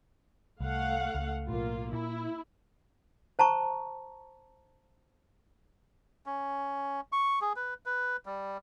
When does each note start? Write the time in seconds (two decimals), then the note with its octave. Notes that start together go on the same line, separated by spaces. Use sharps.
0.60 C2 A3 F5 F#5
1.15 C#2
1.48 B1 A2 A#3 F4
1.93 A#2 E4
3.39 C5 A5 A#5 C#6
6.26 C#4
7.12 C#6
7.41 G#4
7.56 B4
7.86 B4
8.26 G3